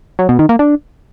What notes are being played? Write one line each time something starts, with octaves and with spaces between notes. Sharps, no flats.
F#3
B2
D#3
A#3
D4